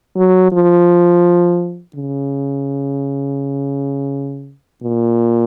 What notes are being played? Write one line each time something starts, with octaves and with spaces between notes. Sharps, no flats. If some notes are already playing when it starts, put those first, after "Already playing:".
F#3
F3
C#3
A#2